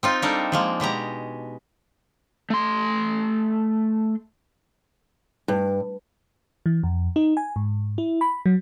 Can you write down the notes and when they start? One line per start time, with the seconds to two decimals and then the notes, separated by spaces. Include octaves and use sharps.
0.03 C4 D#4 F4
0.22 G3 A#3 D4 D#4 A4 A#4
0.52 F3 G#3 A#3
0.80 B2 G#3 G4 A#5
2.50 A3 C6
5.48 G2
6.66 E3
6.83 F2
7.16 D#4
7.37 G#5
7.56 G#2
7.98 E4
8.21 B5
8.46 F#3